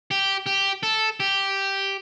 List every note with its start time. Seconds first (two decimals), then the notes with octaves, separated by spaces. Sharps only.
0.11 G4
0.46 G4
0.83 A4
1.20 G4